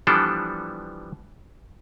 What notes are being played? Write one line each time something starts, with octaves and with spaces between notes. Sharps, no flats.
E3 F3 G3 B3 D4 A4